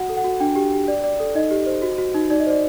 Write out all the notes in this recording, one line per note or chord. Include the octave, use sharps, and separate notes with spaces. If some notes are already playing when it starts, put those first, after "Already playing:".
Already playing: F#4 F#5
A4
F#5
F#4
D4 G5
G4
G4
D5
D5
A4
D#4 D#5
G4
C5
F#4
F#4
D#4
D#4 D5
D#5
C5 D5